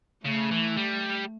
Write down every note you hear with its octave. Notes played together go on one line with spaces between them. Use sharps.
C#3 A3
E3
G3